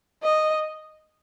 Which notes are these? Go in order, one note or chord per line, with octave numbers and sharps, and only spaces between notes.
D#5